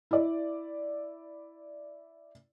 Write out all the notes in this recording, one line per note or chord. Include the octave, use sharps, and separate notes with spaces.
E4 D5